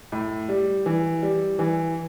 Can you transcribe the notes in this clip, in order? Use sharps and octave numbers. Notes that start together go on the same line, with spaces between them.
A2
G3
E3
G3
E3